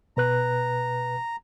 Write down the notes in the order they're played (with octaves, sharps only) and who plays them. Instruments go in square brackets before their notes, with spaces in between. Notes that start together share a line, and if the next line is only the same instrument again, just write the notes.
[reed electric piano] B2 B4 F#6 [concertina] A#5